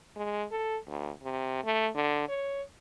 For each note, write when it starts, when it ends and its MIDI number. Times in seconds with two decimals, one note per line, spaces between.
0.16 0.44 56
0.51 0.77 69
0.88 1.10 38
1.23 1.60 48
1.64 1.88 57
1.95 2.24 50
2.29 2.62 73